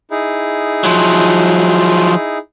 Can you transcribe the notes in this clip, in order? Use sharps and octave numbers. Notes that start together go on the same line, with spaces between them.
D#4 E4 G#4
F3 F#3